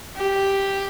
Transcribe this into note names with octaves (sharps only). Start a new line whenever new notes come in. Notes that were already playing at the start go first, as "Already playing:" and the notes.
G4